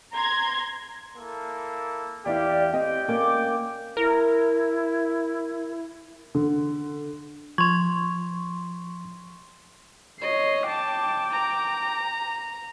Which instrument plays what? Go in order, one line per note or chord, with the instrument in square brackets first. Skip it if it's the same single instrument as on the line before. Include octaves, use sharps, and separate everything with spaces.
[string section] A#5 C6 G#6
[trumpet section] A#3 E4 A4
[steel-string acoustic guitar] E2 E4 [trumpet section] G4 F5 [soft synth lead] D5
[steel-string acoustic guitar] C4 G4 [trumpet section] D5 G5 [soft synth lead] D#5
[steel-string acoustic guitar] A#3 C#4 [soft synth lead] D6
[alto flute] E4 [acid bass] A#4
[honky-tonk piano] D3
[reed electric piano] F3 G#6 [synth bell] C6 C#6
[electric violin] C#5 C7 [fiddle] D#5
[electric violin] G5 D6 [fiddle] A5
[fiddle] A#5